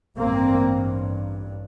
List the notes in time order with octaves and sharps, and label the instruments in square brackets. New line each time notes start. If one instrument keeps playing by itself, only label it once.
[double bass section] A1 G2 A#3 C4